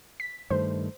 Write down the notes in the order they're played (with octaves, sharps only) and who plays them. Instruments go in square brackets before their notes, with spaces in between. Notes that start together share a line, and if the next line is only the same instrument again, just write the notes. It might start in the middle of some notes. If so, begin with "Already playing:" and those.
[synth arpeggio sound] B6
[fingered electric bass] G2 D#3 A3 [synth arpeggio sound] C5